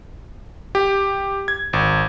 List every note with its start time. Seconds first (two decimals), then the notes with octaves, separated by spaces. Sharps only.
0.75 G4
1.48 G#6
1.73 G#1